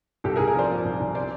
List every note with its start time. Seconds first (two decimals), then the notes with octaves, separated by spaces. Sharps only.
0.24 C2 G4 A4
0.36 G#4 A#4
0.39 C2
0.47 G#4 A#4
0.54 F3 C5 D5
0.70 A#2
0.85 C2
1.00 C2
1.15 C5 D5